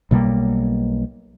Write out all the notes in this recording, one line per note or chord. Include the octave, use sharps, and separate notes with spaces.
B1 B2 G3 A#3